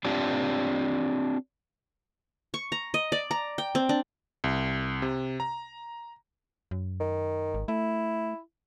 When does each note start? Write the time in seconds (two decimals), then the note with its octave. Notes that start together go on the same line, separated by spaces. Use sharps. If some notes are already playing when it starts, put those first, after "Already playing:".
0.04 C4 D4 F4 G4
2.54 C#6
2.72 A#5
2.94 D#5
3.12 D5
3.31 A#5
3.58 G5
3.75 C4
3.89 D4
4.44 C2
5.02 C3
5.40 A#5
6.71 F#2
7.00 D#3
7.54 G#1
7.68 A3 E4